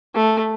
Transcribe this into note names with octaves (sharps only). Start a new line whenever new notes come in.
A3